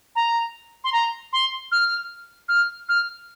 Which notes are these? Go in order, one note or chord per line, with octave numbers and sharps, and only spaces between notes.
A#5
C6
A#5
C6
F6
F6
F6